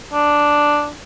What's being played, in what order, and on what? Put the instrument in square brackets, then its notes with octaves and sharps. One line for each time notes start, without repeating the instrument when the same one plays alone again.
[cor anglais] D4